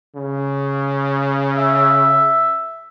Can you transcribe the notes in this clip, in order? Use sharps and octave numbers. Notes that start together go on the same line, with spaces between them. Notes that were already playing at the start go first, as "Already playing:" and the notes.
C#3
E5